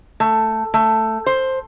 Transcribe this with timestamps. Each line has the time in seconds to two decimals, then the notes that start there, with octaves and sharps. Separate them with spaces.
0.20 A3
0.74 A3
1.26 C5